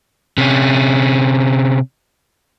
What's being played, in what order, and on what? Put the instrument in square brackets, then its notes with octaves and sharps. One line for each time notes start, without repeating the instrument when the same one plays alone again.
[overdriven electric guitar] C3 C#4